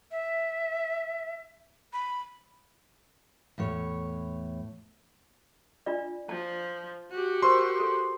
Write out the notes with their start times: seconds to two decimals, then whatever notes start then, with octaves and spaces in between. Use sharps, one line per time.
0.11 E5
1.93 B5
3.58 E2 A2 C#5
5.86 D4 F4 D5
6.29 F3 A5
7.11 F#4 G4
7.42 A#4 C5 C6 C#6
7.80 A4